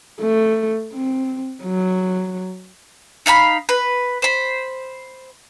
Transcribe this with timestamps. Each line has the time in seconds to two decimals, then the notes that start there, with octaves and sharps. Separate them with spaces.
0.20 A3
0.93 C4
1.63 F#3
3.26 D#4 F5 G#5 B5
3.69 B4
4.22 C5 B5